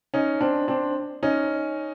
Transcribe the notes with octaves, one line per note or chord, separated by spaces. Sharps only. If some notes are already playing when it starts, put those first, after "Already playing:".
C#4 D#4
C4 D4
C4 D4
C#4 D#4